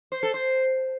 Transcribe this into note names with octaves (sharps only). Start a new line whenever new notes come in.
C5
A4
C5